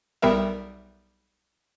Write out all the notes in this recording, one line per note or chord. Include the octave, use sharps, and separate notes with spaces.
B1 G3 B3 A#4 E5